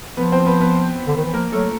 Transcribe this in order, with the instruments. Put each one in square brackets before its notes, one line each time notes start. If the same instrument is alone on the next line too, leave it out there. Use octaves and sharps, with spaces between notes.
[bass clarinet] F3 [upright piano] B3 B4
[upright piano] C4 C5
B3 B4
B3 B4
[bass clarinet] D3
D#3
E3
[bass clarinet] F3 [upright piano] A#3 A#4
[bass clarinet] F#3 [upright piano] A3 A4